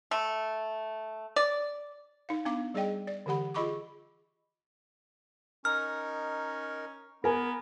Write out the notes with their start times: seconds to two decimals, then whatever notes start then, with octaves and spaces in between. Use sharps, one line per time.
0.11 A3
1.36 D5
2.29 D#4 F5
2.45 B3 D4 F5 D6
2.74 G3 G#4 D5 D#5 G5
3.07 D5
3.26 D3 E3 G4 F#5 B5
3.54 F4 G#4 D#5 B5 C#6 D6
5.65 C#4 D#4 A#4 F6
7.24 B3 A#4 G#5